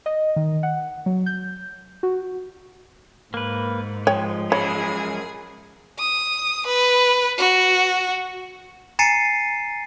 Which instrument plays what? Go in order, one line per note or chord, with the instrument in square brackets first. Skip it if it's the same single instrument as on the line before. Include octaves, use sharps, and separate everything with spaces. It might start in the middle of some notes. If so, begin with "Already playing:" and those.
[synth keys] D#5
D#3
F#5
F#3
G6
F#4
[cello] G#2 [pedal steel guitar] A#3 B4
[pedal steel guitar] F3 G#3 [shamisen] C#5 G5
[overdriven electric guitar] F#2 B5 [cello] G#4 [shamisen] C#5
[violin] D#6
B4
F#4
[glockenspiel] G#5 A#5 A6 C7 C#7 D#7